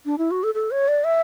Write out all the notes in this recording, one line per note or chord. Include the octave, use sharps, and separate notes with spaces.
D4
E4
F#4
A4
A4
C#5
D5
E5